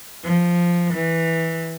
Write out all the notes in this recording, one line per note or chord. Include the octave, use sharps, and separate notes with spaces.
F3
E3